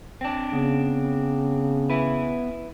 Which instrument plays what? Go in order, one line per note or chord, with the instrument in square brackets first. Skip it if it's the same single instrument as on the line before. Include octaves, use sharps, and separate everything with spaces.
[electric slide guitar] C4 D4
[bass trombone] C#3 [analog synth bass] B3
[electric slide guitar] E4 B4